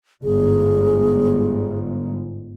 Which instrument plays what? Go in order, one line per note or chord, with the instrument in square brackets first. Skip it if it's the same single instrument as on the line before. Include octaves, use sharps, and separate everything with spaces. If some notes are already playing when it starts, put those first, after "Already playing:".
[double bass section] G1 G#2 [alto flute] G#4